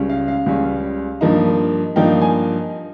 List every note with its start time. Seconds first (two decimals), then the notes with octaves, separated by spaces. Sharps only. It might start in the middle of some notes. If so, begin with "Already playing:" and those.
Already playing: C#2 C#3 G3 C#4
0.09 F5
0.28 F5
0.46 C#2 C#3 G3 C#4
1.21 G2 F3 A#3 D#4
1.96 G2 F3 A#3 D#4 G5
2.21 G#5